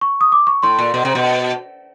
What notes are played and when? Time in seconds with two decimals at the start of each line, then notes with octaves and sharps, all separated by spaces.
0.01 C#6
0.21 D#6
0.32 D6
0.47 C#6
0.63 A2 C6
0.79 A#2
0.94 B2
1.05 C3
1.15 B2